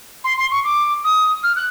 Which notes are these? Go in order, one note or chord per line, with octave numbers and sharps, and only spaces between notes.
C6
C6
C#6
D6
D#6
F6
F#6